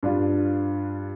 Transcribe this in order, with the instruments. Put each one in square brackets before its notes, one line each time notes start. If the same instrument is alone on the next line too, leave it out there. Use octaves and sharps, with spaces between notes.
[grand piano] G2 D4 F4